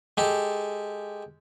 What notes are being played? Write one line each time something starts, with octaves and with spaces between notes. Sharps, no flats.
G#3 G4 A4